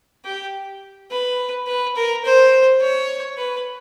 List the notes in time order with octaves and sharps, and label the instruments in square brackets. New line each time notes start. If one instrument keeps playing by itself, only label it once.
[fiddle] G4
B4
B4
A#4
C5
C#5
B4